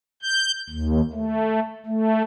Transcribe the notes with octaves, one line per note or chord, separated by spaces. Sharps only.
G6
D#2
A3
A3